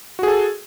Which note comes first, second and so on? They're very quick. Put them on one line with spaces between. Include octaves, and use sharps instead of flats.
F#4 G#4 A4